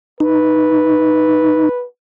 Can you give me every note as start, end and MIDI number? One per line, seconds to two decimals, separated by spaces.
0.20 1.69 63
0.20 1.85 71